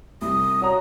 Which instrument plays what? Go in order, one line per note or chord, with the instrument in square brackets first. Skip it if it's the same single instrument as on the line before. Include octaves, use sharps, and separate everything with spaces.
[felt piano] C2 [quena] D#6
[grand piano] F#4 A#5 [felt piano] C#5 F#5